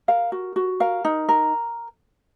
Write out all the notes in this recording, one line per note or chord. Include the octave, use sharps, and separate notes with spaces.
A#4 F5
F#4
F#4
A#4 F5
D#4
A#4